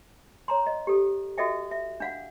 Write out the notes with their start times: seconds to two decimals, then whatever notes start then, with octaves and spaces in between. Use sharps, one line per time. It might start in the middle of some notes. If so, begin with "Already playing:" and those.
0.48 C#5 A#5 C6
0.67 D#5
0.87 G4 A4
1.38 F#4 A4 D#5 E5 G5
1.71 E5
2.00 D4 F5 F#5